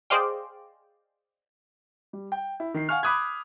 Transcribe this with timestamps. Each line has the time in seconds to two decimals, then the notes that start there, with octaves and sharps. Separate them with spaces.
0.10 G#4 C5 D5 D#5 F5 G5
2.13 G3
2.32 G5
2.60 E4
2.74 D#3 C7
2.89 F5 F#5 G#5 C#6 F6
3.03 B5 D6 D#6 F#6 G#6